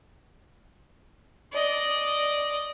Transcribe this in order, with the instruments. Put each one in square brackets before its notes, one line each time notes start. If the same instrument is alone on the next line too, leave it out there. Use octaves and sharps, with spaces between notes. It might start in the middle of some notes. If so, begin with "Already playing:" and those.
[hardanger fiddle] D5 D#5